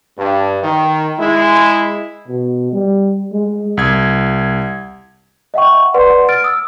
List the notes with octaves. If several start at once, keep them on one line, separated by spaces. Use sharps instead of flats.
G2
D#3
G#3 E4
B2
G3
G#3
C2 G#6
D#5 E5 F#5 G5 C#6
B4 D5 F#5 C6
F6 A6 D7
D#6 E6